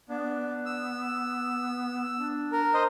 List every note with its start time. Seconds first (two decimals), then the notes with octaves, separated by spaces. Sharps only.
0.09 B3 D4
0.66 E6
2.18 D4
2.52 A#4
2.74 C5 D#5